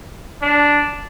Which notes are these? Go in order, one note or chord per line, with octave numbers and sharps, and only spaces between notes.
D4